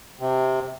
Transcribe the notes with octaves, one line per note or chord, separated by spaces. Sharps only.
C3